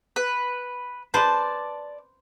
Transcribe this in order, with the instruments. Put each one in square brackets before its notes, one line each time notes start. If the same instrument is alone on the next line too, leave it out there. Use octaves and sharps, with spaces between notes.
[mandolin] B4
[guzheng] B4 C5 [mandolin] D5 A5